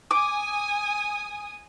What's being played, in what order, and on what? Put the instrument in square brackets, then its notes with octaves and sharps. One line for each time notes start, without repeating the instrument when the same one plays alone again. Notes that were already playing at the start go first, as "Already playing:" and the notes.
[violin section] G#5 D#6 [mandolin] D6